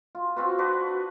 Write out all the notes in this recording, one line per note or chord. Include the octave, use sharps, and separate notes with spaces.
F4
C4 F4 F#4 B4
D4 F#4 B4 C5